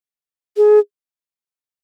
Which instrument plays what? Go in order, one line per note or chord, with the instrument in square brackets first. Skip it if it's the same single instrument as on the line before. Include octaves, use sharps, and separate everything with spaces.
[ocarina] G#4